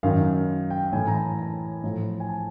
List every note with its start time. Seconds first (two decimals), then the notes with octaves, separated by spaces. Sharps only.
0.03 F#2 D#3 F5
0.70 G5
0.93 A2 E3 G#5
1.07 A#5
1.15 A5
1.39 A#5
1.83 A2 F3
2.20 G#5
2.29 A5